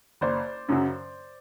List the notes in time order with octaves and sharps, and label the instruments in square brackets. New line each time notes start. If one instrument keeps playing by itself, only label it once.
[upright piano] F#1 C5 D5
F#2 C#3 F#3